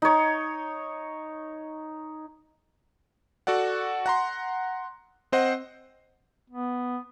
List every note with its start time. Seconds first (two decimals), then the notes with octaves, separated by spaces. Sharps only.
0.02 D#4 C#5
3.47 F#4 A4 D5 F#5
4.06 F#5 A#5 C6
5.32 C4 C5 D#5 F#5
6.50 B3